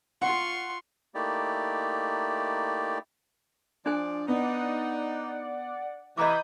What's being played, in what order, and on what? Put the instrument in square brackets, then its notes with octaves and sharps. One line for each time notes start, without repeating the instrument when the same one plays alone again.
[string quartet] F4 C6 C#6 [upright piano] F#5
[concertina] A3 A#3 D#4 E4 G4 D5
[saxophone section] F3 D5 [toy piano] D4 C5 G#5
[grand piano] B3 [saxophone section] D#4 [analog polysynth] D5 F#5
[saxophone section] C3 E3 [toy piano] D#5 A#5 D6 [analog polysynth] B5 D#6 G6